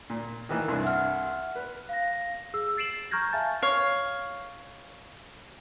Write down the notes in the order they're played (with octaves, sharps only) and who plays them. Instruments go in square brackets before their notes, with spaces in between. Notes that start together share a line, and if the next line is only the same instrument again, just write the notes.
[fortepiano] A#2
D#3 E3 A#3
C2 G2
[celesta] E5 F#5 F6
[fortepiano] B4
[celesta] F5 A#6
G#4 E6
A6 C7 D7 E7 F#7
A#5 C#6 F6 G6 G#6 A#6
E5 F5 G#5 A5 A6
[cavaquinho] C#5 F5